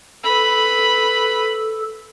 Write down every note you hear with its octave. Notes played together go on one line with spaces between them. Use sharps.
A4 B4 B5